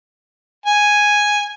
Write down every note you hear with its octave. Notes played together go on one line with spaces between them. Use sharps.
G#5